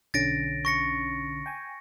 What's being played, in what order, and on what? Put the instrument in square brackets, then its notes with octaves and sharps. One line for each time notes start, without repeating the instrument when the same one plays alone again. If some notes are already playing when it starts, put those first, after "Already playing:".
[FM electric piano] B1 D3 C#4 [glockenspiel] A6 A#6 D7
[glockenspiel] C#6 A#6 C#7
[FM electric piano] G5 G#5